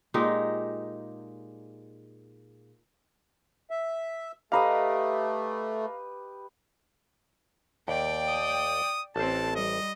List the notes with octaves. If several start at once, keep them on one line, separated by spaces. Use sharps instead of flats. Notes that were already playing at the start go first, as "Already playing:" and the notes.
A#2 G#3 D#4 G4
E5
A3 G4 B4 D#5 F5 A#5
D#2 D5 G5
D#6
A1 C4 A4 C5 A5
G3 D#5